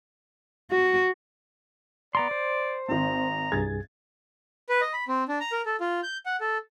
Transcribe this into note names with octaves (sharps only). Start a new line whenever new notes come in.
F#4
B3 D5 A#5 C6
C5
G#1 C4 A#5
C2 G2 G#4 G#6 A6
B4
D#5
B5
C4
D4
A#5
A#4
A4
F4
G6
F#5
A4